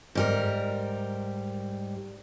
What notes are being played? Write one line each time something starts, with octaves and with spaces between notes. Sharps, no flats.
G#2 G3 A#4